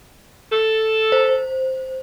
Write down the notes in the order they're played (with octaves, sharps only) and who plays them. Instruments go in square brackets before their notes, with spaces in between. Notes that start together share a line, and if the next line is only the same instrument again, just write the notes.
[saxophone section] A4
[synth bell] C5